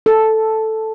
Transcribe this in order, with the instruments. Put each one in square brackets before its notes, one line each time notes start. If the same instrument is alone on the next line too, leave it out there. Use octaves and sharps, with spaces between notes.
[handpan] A4